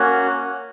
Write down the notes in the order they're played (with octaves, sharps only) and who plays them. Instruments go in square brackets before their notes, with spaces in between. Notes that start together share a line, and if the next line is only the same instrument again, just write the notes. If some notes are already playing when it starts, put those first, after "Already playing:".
Already playing: [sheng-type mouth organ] A#3 C#4 F#4